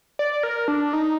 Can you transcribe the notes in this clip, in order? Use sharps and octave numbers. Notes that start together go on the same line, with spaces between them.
D5
A#4
D4
D#4